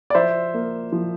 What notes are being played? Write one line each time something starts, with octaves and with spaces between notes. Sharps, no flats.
D5
F3 C5 E5
A#3
F3